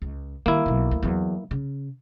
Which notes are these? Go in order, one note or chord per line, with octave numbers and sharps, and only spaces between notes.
C#2
D#3 G3 A#3 E4
B1 F#3
D2
E2 F#3
C#3